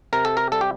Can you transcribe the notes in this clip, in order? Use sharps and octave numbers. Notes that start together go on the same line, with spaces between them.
C3 A#4
A4
A#4
G3 A4
G4